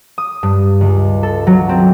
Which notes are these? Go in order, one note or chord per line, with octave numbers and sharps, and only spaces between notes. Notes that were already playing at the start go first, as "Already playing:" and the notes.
D#6
G2
C#2
A4
F#3
C4